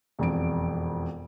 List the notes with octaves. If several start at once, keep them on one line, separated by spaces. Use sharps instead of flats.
E1 F2 D7